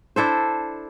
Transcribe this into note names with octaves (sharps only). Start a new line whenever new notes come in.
D4 E4 A4 C5